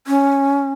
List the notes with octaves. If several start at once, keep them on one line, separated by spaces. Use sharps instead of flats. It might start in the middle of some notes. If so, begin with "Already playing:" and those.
C#4